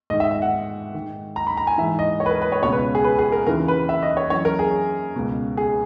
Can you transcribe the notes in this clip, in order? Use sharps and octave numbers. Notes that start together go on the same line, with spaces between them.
G#2 D#3 D#5
E5
E5
F#5
G#2 D#3
A#5
B5
A#5
G#5
G#2 E3 E5
D#5
C#5
B4
A#4
B4
C#5
C#2 B2 C#5
B4
G#4
B4
G#4
A#4
D#2 C#3 E3 A#4
B4
E5
D#5
C#5
F#2 E3 C#5
A#4
G#4
C#2 B2
G#4